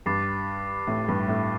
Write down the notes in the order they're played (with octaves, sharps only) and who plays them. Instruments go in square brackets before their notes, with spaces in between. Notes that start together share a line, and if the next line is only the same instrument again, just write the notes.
[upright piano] G2 [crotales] D6 A6 C7
[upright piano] A2
G2
A2